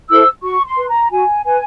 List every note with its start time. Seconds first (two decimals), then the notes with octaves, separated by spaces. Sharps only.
0.09 E4 A4 C5 E6
0.43 F#4 C#6
0.66 C6
0.77 B4
0.89 A#5
1.11 F#4 G#5
1.45 B4 G#5